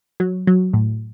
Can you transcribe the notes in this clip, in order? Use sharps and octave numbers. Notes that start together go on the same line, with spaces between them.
F#3
F#3
A2